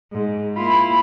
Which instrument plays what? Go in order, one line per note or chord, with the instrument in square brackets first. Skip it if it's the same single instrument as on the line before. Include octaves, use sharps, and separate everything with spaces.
[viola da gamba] G#2
[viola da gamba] A#3 E4 F4 [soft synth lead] B5